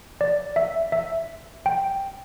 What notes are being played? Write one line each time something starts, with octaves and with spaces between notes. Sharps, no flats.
D5
E5
E5
G5